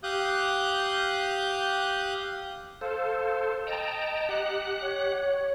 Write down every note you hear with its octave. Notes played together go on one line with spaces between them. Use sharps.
G4 F5 D#6 F#6 G6
A4 C5 F5
D#5 G5 A5 A#5
G4 F#5 F#6
C#5